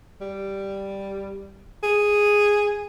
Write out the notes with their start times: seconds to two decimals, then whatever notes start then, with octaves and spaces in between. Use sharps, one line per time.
0.21 G3
1.83 G#4